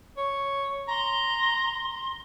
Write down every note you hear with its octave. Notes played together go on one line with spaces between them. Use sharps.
C#5
A#5 C6